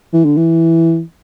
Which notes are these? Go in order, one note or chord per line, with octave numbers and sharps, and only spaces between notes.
E3
D3
E3